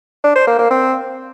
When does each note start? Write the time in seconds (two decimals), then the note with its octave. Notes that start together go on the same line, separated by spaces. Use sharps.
0.24 D4
0.35 C5
0.47 A#3
0.59 A#3
0.70 C4